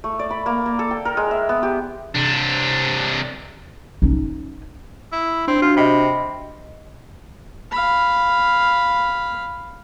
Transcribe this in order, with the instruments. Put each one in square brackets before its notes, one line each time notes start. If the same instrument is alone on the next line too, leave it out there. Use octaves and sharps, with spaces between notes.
[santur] A3
D5
B5
A#3
A#3
A4
G5
A#4
G#3
E5
B3
G4
[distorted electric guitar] C3 D4
[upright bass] C#4 D#4
[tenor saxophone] E4
[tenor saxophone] C4 [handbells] D4
[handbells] D4 F#4 [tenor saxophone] F4
[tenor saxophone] C3 [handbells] D#5 G5 B5
[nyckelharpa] F5 B5